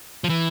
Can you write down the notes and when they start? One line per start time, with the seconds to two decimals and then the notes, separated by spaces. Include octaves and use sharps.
0.24 F3
0.29 E3